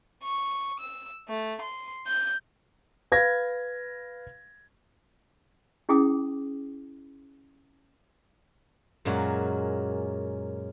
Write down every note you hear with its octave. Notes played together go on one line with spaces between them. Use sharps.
C#6
E6
A3
C6
G6
B4 F5 G#6 A#6
C#4 E4 G#4 G5 D6 D#6
F#2 A#2 F#3 G#3 F#4